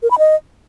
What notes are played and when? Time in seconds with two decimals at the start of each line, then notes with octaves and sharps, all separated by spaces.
0.03 A#4
0.11 B5
0.18 D#5